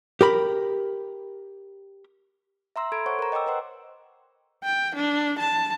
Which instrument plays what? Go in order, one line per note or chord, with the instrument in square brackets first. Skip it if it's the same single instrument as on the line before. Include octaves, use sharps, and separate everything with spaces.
[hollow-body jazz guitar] G4 A#4 B5
[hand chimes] E5 A#5 C6 E6
A4 B5 C6 G#6 D7
C5 C#5 F#5 C#6
A#4 A#5
D#5 G5 A#5 D6 E6
B4 C5 F#5 C6
[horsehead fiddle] G5
D4
A5